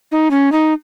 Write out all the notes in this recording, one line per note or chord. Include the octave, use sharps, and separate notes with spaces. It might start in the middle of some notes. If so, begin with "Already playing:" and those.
D#4
C#4
D#4